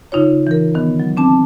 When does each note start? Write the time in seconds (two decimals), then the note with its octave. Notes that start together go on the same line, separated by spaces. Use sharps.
0.12 C#3 D#4 F4 C#5
0.47 E3 A#4
0.75 D#3 B3
1.00 F#3
1.17 C4 D4 A5